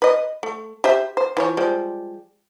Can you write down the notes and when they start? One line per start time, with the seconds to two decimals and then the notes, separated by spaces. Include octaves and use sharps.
0.02 B4 D#5
0.43 A3
0.84 G4 C5 E5
1.17 C5
1.37 E3 F3 C#5
1.57 F3 G3 G#3